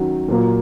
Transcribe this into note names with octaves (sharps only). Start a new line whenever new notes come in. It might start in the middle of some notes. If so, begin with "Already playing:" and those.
Already playing: D#3 F#3 C#4 F#4
A#2 F#3 A#3